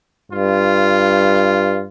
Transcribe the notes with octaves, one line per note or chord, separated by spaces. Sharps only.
G2 F4